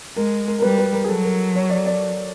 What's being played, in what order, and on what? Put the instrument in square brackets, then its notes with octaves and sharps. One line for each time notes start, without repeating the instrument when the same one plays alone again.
[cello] G#3 [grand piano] A#4
[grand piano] A#4
A#4
[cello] G3 [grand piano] B4
[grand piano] B4
A#4
G#4
[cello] F#3 [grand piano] A4
[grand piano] A#4
C#5
D5
D5